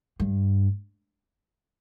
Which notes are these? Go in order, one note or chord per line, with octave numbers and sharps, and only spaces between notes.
G2